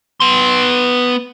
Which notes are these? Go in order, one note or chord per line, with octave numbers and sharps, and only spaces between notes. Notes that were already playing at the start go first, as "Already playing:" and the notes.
B3 C6